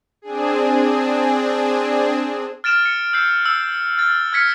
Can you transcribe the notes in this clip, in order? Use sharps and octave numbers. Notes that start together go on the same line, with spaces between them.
C4 D4 G#4
F6 A6 D7 E7 F7
C#7
E6 G6 C7
E6
F6 A6
F6 G#6 B6 C#7